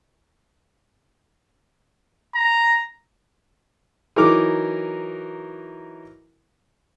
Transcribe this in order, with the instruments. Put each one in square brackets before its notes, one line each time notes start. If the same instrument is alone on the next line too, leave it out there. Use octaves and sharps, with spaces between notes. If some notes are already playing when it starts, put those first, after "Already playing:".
[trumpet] A#5
[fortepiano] E3 F#3 D#4 A#4 D6